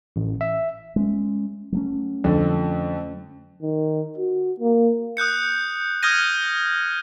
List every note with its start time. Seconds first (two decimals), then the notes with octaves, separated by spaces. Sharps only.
0.16 A1
0.41 E5
0.96 G#3 C#4
1.72 F#3 A3 C#4
2.24 F2 D3
3.62 D#3
4.18 F#4
4.60 A#3
5.17 D#6 F#6 G6 C#7
6.02 D#6 F6 G6 G#6 A#6 D#7